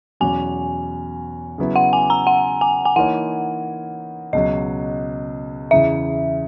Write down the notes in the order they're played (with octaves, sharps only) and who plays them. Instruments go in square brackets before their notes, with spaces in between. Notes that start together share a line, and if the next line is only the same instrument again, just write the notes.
[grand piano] E2 B2 F#3 C#4 F#4 [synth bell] G#5
[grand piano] C#3 F#3 B3 E4
[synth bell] F#5
G#5
A#5
F#5
G#5
G#5
[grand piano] E3 A#3 D#4 A#4 C#5 [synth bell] F#5
[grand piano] C#2 B2 F#3 [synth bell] D#5
[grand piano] E2 C#3 E3 [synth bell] E5